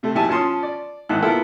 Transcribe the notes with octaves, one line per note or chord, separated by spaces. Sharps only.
C3 A3
D#2 F#3 E4 G4 G#5 A5
F3 C#4 A5 C6 D#6
D5
G#1 D#3 E4 F#5 F#6
A#3 B3 E4 F4 A4 A#4